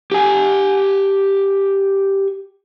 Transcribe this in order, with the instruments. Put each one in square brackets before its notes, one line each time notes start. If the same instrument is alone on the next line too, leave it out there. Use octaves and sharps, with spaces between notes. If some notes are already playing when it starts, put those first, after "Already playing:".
[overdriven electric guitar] G4 G#5